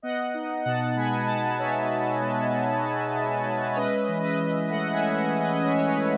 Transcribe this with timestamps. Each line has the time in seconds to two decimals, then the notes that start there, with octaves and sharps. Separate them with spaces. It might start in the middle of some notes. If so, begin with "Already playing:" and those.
0.02 B3 D#5 F#5
0.34 D#4
0.65 B2 F#5 A5
0.96 G#3 G#5 B5
1.27 B3 F#5 A5
1.59 D#4 C#5 E5
1.90 B2
2.21 G#3
2.52 B3
2.83 D#4
3.15 B2
3.45 G#3
3.73 C#5
3.76 C#4 B4 D#5
4.08 E3
4.23 B4 D#5
4.39 E3
4.70 A3 D#5 F#5
4.88 F#5
4.93 E5 G#5
5.01 C#4
5.17 D#5 F#5
5.32 E3
5.40 B4 D#5
5.55 D#5
5.63 E3 C#5 E5
5.77 C#5
5.87 B4 D#5
5.95 A3